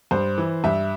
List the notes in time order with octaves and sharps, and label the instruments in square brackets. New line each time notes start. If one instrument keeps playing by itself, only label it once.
[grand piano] G2 C5
E3
G2 E5